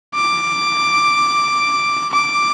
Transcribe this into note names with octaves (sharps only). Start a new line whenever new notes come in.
D6
D6